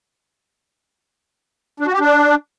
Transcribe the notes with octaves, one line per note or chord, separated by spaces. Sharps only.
D4
F#4
G4
D4